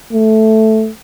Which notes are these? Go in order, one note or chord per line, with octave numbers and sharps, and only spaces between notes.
A3